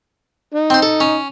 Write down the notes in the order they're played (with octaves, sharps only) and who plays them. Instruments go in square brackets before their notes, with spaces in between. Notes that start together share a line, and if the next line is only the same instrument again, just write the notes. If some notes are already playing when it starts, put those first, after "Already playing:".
[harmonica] D#4
[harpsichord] C4 C5
A4
C#4